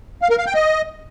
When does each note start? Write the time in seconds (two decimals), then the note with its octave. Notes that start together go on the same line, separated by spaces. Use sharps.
0.22 F5
0.30 A#4
0.38 F5
0.46 G5
0.54 D#5